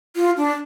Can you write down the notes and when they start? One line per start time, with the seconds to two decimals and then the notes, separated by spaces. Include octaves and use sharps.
0.16 F4
0.37 D4